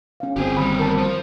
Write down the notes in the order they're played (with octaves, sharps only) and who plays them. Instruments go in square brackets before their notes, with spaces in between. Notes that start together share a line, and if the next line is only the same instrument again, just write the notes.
[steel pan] C#4 F5
[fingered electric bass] G1 C4 [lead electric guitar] G4 G#4
[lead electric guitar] D#2 G3 [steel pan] B5 D#6
[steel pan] A#4 A5
[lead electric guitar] F3